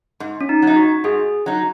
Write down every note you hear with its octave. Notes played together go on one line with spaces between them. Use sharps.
G#2
C#4
D#4
F#3 D#4
F#4
G#2 G#4
F#3 D#4